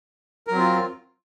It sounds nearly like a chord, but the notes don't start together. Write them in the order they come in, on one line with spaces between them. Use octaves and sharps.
A#4 F#3 C4 F4